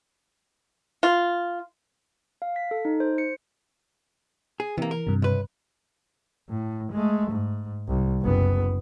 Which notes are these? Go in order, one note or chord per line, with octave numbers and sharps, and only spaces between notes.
F4
F5
B6
A4
D#4
C5
C#7
G#4
C3 E3 A#3
A#4
G2 C3
C#2 B4
A2
G#3 A3
G#2
C2
F#1 B3